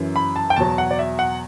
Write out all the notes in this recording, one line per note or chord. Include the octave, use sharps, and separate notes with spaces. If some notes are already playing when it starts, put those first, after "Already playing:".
Already playing: F#2 E3
B5
A5
G5
E2 B2 F#3 A5
F#5
D5
E5
F#5